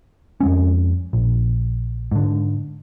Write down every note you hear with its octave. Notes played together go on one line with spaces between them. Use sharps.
F2 G#3 C#4
A#1
G#2 D3